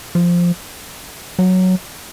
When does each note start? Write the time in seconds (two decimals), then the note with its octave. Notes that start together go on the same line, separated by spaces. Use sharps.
0.15 F3
1.39 F#3